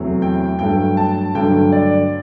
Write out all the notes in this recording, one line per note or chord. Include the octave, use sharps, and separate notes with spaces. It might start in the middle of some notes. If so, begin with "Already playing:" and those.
Already playing: E2 C3 F#3 A3
G5
G2 F#3 A3 G5
A5
G2 D3 F#3 A3 G5
D5